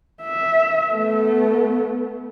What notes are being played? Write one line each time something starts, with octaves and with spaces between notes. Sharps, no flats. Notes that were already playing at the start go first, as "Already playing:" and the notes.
E5
A3 B3